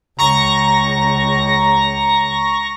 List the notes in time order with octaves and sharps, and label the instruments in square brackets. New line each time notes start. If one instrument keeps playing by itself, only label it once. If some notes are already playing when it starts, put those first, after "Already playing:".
[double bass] C#2 [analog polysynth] A#5 C#6 A#6